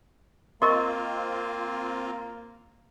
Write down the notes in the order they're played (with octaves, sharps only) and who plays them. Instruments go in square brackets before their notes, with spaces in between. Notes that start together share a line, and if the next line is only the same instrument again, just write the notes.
[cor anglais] A#3 [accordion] C4 F4 [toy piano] A#4 D#5 [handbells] C6 C#6 A6